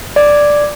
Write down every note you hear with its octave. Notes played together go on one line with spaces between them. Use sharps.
D5